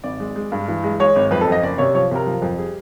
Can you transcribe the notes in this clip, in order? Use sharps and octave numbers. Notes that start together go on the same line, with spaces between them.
G#1 D5
G#3
G#3
G2
E3
G#3
G#3 C#5
G#1
F2 B4
A4
F2 D#5
F#1 D5
C3 C#5
F3 C#5
C3 A#4
F3
F2
G3 G#4